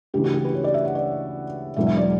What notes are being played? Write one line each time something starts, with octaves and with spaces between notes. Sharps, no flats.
D2 C#3 E3 G4
F#4
G4
B4
C#5
D5
E5
F#5
D5
E1 E2 D3 F#3 E5
E5
D5